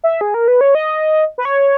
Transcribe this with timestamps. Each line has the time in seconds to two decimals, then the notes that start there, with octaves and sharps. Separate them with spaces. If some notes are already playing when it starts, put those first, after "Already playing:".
0.04 E5
0.21 G#4
0.34 A#4
0.48 B4
0.61 C#5
0.75 D#5
1.38 B4
1.45 C#5